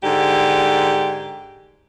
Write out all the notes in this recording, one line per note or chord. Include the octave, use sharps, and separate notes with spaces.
G#2 D3 G4